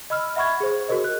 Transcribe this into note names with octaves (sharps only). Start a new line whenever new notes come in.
D#5 B5 E6 F6
E5 F#5 B5 C#6 G#6
G#4 C5
F#4 G#4 A#4 C5 D#5
F#6